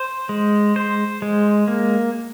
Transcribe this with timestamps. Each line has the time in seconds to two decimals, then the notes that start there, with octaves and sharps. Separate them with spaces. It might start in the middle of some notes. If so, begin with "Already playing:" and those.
Already playing: C5
0.29 G#3
0.76 C5
1.22 G#3
1.68 A#3